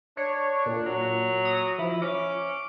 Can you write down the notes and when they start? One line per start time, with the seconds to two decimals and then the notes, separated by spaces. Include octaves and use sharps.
0.17 D4 C#5
0.66 A#2
0.86 F#3
1.45 D#6
1.78 F3 E4
2.02 C#4 D6